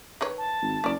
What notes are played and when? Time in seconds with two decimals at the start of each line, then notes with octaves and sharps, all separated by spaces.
0.21 D#3 B4 C#5
0.38 A5
0.62 G#1
0.84 F#1 C#4 D5